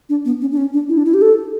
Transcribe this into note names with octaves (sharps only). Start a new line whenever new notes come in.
D4
B3
C#4
D4
C#4
D4
E4
D4
E4
G4
A4